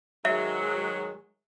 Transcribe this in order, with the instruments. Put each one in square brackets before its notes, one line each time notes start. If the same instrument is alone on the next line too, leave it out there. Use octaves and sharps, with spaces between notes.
[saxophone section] G#2 D#3 F#3 [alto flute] G#3 [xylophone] E5